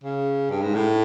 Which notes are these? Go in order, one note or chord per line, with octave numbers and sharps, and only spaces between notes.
C#3
G2
G#2
A2